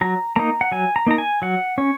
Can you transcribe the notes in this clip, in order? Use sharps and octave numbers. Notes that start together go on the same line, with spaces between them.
F#3 A#5
A#3 D#4 A#5
F#5
F#3 G#5
A#5
A#3 D#4 A#5
G#5
F#3 F#5
C#4 C#5